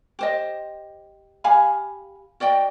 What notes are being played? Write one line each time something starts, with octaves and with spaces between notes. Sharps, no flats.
G4 C5 D#5
G4 F5 G#5 B5
F#4 D5 D#5 G5